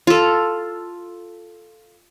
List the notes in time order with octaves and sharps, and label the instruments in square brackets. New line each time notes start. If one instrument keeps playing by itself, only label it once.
[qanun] F4 A4